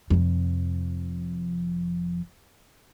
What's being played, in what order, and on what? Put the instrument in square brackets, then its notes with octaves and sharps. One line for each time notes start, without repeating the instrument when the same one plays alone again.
[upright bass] F1 F2